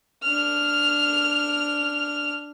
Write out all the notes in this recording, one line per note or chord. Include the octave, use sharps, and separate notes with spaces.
D4 F6